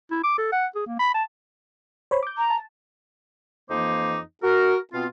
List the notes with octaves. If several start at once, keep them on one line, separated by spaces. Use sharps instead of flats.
E4
D6
A4
F#5
G#4
A#3
B5
A5
C5 C#5 B5
D6 G6
A#5
A5
F2 E3 A#3 D#4 C5 D6
F#4 A#4
B2 B3 C4 F4